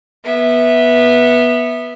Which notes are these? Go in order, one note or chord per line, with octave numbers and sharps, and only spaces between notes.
B3 E5